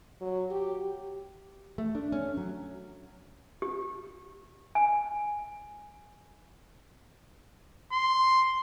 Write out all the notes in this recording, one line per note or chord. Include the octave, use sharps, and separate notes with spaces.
F#3
G4
A3
D4
C#4
F#3
G4
G#5
C6